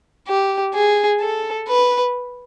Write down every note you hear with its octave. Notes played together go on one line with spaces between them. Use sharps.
G4
G#4
A4
B4